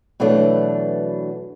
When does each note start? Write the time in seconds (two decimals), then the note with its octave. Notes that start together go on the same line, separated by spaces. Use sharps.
0.20 B2 E3 F#3 A3 D4